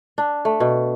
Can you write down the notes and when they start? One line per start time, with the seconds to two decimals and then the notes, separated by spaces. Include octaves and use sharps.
0.18 D4
0.45 A3
0.60 B2